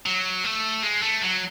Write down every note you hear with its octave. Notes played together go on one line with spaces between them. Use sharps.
F#3
A3
G#3
A3
F#3